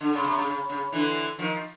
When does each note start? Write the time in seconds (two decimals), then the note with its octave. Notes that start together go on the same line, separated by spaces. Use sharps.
0.01 D3
0.13 C#3
0.24 C3
0.36 C#3
0.47 C#3
0.69 C#3
0.92 D3 E3
1.38 D#3 F3